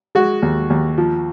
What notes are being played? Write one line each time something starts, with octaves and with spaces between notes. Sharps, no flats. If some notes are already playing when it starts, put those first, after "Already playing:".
G#3 F#4
D#2
D#2
F3